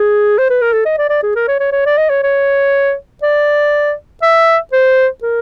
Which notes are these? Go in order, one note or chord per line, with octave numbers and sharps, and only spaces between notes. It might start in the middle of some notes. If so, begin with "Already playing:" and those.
Already playing: G#4
C5
B4
A#4
A4
D#5
D5
D5
G#4
A#4
C#5
C#5
C#5
D5
D#5
C#5
C#5
D5
E5
C5
A#4